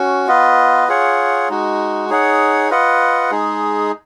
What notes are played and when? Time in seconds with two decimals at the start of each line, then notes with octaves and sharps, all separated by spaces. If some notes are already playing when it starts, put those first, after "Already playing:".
Already playing: C#4 F#4
0.27 B3 F4 B4 D#5
0.88 F4 G#4 C#5 F#5
1.49 G#3 D#4 F#4
2.09 D#4 G#4 C#5 F#5
2.70 F4 B4 D#5 F#5
3.31 G#3 D#4 G#4